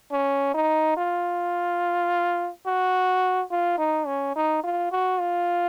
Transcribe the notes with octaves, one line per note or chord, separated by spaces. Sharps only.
C#4
D#4
F4
F#4
F4
D#4
C#4
D#4
F4
F#4
F4